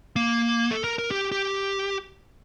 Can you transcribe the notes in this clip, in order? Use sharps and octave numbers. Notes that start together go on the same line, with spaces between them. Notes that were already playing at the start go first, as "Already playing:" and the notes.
A#3
A4
A#4
A#4
G4
G4